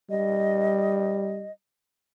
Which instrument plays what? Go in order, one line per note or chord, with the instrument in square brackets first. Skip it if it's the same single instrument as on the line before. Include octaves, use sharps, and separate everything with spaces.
[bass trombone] G3 [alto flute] D#5